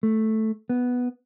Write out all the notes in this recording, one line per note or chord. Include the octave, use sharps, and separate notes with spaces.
A3
B3